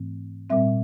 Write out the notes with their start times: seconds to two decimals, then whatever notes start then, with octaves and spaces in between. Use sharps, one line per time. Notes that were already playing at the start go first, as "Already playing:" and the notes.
Already playing: G#2 E3 A3 C4
0.50 A#2 G3 C4 E5